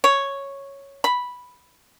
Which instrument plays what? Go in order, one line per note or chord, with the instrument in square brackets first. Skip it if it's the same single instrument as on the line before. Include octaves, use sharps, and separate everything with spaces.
[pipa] C#5
B5